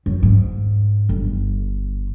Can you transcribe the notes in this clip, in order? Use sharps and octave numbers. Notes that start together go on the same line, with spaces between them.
F#2
G#2
G1